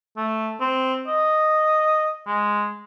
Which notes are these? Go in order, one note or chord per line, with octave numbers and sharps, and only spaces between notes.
A3
C4
D#5
G#3